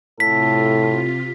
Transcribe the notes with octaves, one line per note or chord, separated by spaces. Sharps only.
A2 C3 F4 A4 B6